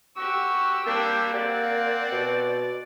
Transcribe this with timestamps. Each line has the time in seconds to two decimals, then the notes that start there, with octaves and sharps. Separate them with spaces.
0.16 F#4 G4 C#6 E6
0.87 G3 A#3 C4 D4
1.34 C4 D5 F#5
2.12 B2